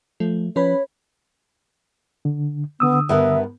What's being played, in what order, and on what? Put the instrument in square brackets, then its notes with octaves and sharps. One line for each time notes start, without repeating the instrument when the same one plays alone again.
[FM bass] F3 [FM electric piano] A3
[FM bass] F3 [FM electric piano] C#4 B4 B5 [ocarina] C#5
[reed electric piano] D3
[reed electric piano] D3 D#6 E6 [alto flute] B3
[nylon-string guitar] G2 B3 A#4 [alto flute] E5